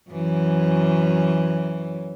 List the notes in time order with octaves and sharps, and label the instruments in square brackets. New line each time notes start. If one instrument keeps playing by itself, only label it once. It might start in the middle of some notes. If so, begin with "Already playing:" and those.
[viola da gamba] F#2 E3